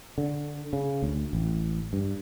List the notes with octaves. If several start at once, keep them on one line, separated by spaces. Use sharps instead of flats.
D3
C#3
D2
A1
G2